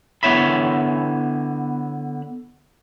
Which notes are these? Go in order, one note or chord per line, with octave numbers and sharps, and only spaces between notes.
D3 B3 E4 C#5 E5 B5